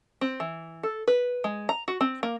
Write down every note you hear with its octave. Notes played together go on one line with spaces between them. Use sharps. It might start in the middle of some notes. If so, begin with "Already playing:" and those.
C4
E3
A4
B4
G#3
A#5
F#4
C4
A#3